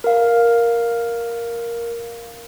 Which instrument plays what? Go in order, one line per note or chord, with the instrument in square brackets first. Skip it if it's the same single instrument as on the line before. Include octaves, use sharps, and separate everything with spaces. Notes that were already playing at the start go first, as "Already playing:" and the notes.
[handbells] A#4 F5